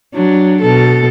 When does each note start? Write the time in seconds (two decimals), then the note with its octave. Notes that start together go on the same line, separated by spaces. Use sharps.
0.14 F#3 D4
0.61 B2 A4